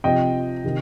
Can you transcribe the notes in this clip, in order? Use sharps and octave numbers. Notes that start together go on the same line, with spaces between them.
C3 F3 C4 D#5 G5
C3 D#3